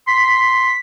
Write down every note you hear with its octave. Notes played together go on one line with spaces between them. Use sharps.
C6 B6